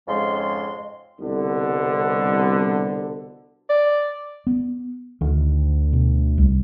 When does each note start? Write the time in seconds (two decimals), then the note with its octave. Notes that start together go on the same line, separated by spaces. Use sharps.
0.08 F2 G#2 C#3 G#3 C6
1.20 C2 B2 D3
3.70 D5
4.47 B3
5.21 D2 D#3
5.93 B2
6.38 C2